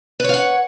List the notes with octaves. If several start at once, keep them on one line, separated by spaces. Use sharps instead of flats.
B4 C#5 F5 F#5